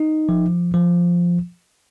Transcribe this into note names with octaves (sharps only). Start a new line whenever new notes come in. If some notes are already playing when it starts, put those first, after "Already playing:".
Already playing: D#4
F3
F3